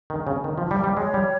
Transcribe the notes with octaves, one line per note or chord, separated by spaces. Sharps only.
D#3
C#3
D#3
F3
G3
G3
G#3 C#5
G3